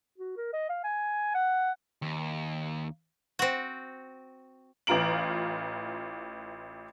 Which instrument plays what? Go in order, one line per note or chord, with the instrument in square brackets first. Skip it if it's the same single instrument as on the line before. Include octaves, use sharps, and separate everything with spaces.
[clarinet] F#4
A#4
D#5
F5
G#5
F#5
[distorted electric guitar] D#2
[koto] C4 F#4
[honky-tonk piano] A1 E3 F4 A#5 D7 F#7